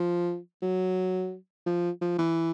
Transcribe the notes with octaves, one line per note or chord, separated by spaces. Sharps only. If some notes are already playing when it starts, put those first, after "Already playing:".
Already playing: F3
F#3
F3
F3
E3